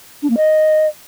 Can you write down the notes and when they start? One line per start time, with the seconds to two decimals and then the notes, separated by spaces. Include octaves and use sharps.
0.22 D4
0.29 A#3
0.36 D#5